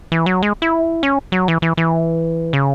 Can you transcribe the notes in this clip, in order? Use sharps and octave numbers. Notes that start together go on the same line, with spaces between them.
E3
F#3
G#3
E4
C#4
F#3
E3
E3
E3
C#3